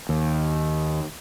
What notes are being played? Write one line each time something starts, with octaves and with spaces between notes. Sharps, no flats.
D#2